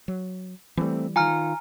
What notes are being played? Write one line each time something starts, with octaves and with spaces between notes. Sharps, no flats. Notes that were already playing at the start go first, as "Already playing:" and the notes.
F#3
E3 G3 A3 A#3 C4
D#3 F4 G#5 A#5 F6